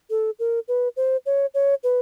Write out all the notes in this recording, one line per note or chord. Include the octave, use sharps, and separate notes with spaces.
A4
A#4
B4
C5
C#5
C#5
B4